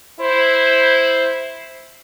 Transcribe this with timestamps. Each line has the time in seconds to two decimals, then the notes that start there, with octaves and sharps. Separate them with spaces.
0.20 E4 C5